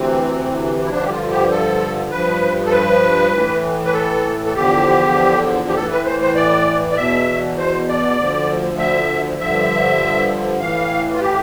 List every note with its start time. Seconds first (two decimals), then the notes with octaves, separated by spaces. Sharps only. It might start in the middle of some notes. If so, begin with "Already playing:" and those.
Already playing: D2 C3 E3 C4
0.85 E4
0.90 G2 D3 F3 D4
1.04 G4
1.10 F4
1.31 G4
1.51 A4
2.11 G2 F3 B4
2.66 A4
2.71 B4
3.33 A2 E3
3.85 B4
3.93 A4
4.46 A4
4.54 E2 D3 F3 G4
5.68 G4
5.75 A2 E3 A4
5.91 B4
6.05 C5
6.21 C5
6.35 D5
6.91 D5
6.96 E2 B2 E5
7.58 C5
7.88 D5
8.18 D2 D3 F3
8.78 E5
9.38 G2 D3 F3 E5
10.60 A2 E3 F5
11.14 F4
11.21 G4